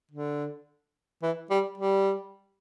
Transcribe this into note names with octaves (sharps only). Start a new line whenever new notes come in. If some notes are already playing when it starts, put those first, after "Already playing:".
D3
E3
G3
G3